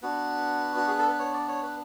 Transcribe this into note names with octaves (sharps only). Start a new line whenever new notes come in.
B3 D4 F#4 B4
F#4
G#4
A4
B4
C#5
D5
C#5
B4